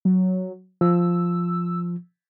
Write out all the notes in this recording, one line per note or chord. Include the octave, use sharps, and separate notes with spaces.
F#3
F3 E6